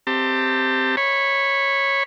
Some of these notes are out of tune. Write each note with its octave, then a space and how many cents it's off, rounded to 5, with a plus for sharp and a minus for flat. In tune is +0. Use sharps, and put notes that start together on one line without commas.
C4 +0 G4 +0 A5 +30
C#5 -10 B5 +0